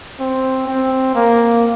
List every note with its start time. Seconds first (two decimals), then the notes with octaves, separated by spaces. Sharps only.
0.20 C4
0.68 C4
1.15 A#3